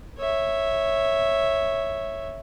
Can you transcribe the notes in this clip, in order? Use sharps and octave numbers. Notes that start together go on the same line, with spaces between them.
C#5 E5